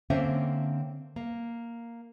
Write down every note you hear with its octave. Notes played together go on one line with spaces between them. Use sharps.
D3 A#3 C4 C#4 C5 E5
A#3